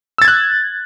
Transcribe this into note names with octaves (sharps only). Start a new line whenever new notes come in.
E6 F#6 G#6 A6